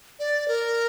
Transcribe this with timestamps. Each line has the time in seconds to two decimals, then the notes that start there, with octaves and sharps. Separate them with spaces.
0.19 D5
0.48 A#4